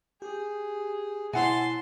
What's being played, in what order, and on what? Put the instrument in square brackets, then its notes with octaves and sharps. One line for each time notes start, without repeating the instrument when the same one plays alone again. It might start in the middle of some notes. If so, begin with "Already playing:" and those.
[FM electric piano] G4 [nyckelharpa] G#4
[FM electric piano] B2 E4 [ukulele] C#5 F#5 G#5 [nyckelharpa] A5 C6